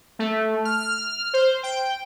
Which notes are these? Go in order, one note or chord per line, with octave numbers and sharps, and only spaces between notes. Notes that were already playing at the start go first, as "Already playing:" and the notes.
A3
F6
C5
G5